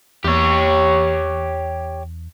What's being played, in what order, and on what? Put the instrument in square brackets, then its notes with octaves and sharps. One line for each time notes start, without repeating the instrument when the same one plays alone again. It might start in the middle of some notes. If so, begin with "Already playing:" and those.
[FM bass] E2 [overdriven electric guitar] G4 C#5